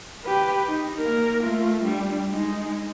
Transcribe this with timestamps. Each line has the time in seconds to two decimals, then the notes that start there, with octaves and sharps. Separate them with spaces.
0.25 G4 B4
0.66 D#4
0.99 A#3 A#4
1.42 A3 F4
1.84 G3 D4
2.31 G#3 D#4